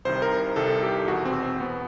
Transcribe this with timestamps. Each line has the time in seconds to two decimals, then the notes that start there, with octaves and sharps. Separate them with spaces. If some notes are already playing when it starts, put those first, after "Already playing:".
0.05 C2 C3 D#3 C5
0.22 A#4
0.56 C2 C3 D#3 A4
0.83 G4
1.08 E2 B2 F#4
1.25 C4
1.43 C4
1.60 E2 B2 B3